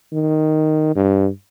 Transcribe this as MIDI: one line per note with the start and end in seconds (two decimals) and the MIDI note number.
0.12 0.95 51
0.96 1.28 43